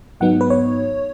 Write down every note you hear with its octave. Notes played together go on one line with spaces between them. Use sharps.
G#2 F#3 B3 D#4 F#5
B4
C#5